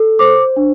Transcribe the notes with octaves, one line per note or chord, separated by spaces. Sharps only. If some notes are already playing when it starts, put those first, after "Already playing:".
Already playing: A4
C5 D6
D4